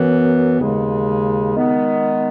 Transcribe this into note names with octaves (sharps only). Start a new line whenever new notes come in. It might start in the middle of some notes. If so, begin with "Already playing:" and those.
Already playing: F#2 E3 B3
D#2 C#3 G#3
D#3 G#3 B3